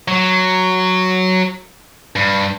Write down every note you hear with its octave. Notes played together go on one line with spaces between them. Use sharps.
F#3
G2